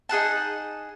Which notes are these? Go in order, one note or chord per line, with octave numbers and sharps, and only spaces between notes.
D#4 G#4 F#5 A5